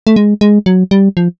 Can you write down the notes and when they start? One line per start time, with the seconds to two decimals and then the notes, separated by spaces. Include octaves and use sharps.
0.07 A3
0.16 G#3
0.41 G#3
0.66 F#3
0.91 G3
1.17 F3